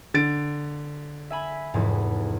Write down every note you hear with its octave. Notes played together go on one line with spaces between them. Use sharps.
D3 A6 D7
E5 G#5 B5
F1 E2 G#2